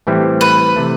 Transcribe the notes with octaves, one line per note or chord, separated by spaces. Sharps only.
A2 E3 G3 C4 E4
B4
C3 E3 A3